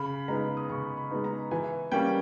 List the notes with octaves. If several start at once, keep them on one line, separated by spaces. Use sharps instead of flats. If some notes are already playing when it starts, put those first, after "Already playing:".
Already playing: C#3 B5
G#3 B3 D#4 A#5
D#6
C#3 C#6
B5
G#3 B3 D#4
A#5
E3 G#5
G3 A#3 C#4 G5